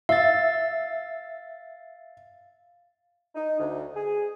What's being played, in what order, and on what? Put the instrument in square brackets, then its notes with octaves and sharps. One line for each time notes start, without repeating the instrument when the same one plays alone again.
[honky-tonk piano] E5 [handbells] F5 A6
[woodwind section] D#4
D2
G#4